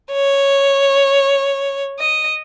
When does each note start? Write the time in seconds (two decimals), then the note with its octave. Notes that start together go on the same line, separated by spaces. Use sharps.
0.13 C#5
2.00 D#5